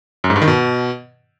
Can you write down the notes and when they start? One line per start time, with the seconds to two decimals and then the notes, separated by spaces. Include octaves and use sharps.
0.24 F#2
0.30 G#2
0.36 G2
0.42 D#3
0.48 B2